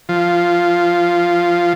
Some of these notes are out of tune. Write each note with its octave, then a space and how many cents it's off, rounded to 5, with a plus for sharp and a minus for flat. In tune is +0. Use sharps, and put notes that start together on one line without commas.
F3 -5